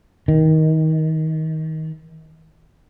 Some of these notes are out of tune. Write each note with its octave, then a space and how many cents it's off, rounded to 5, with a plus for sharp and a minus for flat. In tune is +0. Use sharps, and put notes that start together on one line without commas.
D#3 +25